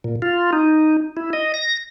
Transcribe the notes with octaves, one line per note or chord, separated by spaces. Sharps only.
A#2
F4
D#4
E4
D#5
A#6